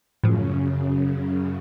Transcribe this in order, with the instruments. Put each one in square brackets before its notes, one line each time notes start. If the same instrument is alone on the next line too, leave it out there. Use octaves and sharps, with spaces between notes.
[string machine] F#2 C#3 [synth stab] A2 F3